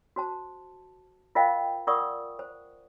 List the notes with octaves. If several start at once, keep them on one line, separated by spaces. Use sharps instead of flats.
F#4 C5 A5
F4 A#4 C5 D#5 F5 G5
F4 A#4 D5 F#5 C#6 D#6
C5